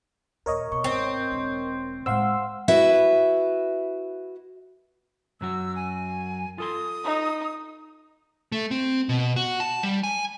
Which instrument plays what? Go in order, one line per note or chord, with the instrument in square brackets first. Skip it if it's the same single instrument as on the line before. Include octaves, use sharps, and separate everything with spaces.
[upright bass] D#2 A#2 [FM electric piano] A#4 C#5 D#5
[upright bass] B2 [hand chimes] C#6
[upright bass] G#1 [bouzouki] C4
[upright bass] E1 D4
[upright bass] A2 G#3 [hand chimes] C5 F#5 [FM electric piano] F5 C6 E6
[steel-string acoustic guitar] E4 F#4 B4 E5
[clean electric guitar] F#2 F#3 F#4 [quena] E6
[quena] G#5
[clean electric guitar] F4 A4 C6 [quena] D#6
[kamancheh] D#4
[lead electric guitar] A3
C4
B2
F#4
A5
G3
G#5